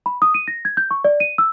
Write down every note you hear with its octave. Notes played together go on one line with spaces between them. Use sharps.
B5
D#6
D#7
A#6
G#6
G6
C#6
D5
D#7
E6